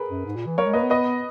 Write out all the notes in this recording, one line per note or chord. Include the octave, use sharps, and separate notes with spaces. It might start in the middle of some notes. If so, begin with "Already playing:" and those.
Already playing: G#4 A#4 B4
F#2
G#2
A#2
E3
F#3 A#4 C#5
G#3
A#3 B4 D#5
B3
B4 D#5